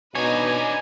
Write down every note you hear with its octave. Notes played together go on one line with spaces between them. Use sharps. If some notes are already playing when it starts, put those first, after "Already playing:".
B2 D4 D#4 B4 C#5 G#5